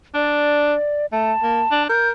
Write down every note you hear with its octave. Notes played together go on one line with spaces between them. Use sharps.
D4 D5
A3 A5
A#3
D4
A#4 G6